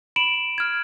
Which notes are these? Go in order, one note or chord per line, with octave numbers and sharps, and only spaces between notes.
B5 D7 E7 F#7
F6 G#6